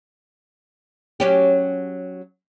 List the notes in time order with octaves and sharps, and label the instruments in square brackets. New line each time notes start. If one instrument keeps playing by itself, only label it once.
[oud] F#3 C#4 G4